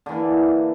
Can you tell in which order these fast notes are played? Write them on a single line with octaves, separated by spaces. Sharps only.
D3 E3 A#3